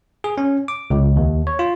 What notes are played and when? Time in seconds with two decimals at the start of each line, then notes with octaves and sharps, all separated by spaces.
0.24 G#4
0.38 C#4
0.68 D6
0.90 C#2
1.16 D#2
1.47 C#5
1.59 F4